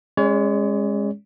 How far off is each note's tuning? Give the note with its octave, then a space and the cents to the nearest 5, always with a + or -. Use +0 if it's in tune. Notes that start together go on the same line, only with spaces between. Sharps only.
G#3 -20 C#4 -20 C#5 +40